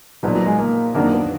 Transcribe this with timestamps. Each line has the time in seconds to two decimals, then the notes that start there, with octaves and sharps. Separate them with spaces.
0.23 A#2 F3 F#3 B3 D#4
0.35 F#3
0.46 G#3
0.59 A#3
0.94 F2 D#3 F#3 A#3 D4 F#4
1.13 B3